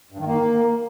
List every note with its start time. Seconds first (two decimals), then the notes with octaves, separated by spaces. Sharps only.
0.12 G2
0.19 D#3
0.26 A#3